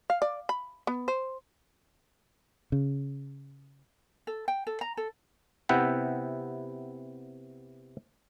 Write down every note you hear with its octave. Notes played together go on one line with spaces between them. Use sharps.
F5
D5
B5
B3
C5
C#3
A4
G5
A4
A#5
A4
C3 B3 E4 E5 F#5 G5